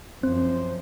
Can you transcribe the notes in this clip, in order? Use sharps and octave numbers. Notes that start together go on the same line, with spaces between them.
F#2 F3 C4 C5